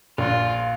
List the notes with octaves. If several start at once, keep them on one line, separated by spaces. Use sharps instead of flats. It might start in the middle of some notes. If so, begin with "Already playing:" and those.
A#1 F4